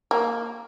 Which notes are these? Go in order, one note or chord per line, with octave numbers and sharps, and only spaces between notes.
A#3